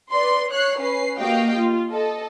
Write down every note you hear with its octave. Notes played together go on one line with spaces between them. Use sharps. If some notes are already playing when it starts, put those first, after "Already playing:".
B4 D5 C6
C#5 F#6 C7
C#4 B4 C7
A#3 F#4 G4 D#5 F5 G5
F4
A4 D#5